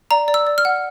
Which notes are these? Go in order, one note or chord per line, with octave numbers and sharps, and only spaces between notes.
D5 A#5
D5
E6
D5
F6
F#5